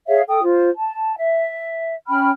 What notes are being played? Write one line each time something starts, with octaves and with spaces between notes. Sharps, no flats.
G#4 C#5 E5 F5
A4 G5 D#6
F4 C5
A5
E5
C#4 G5 B5 F6